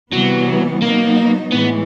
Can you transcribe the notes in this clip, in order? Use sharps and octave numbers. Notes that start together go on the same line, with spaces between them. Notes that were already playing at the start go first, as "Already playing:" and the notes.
C3 E3 F#3 G3 B3
F#3 A#3 B3 D#4
A2 E3 G#3 B3